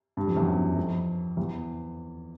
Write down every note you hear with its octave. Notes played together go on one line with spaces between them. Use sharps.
G2
F2
E2
F#2
F2
E2